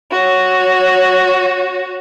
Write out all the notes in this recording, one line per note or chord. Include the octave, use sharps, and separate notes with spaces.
F#4 C#5